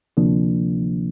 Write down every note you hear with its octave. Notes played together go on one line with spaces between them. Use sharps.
D2 C3 F3 A#3 D4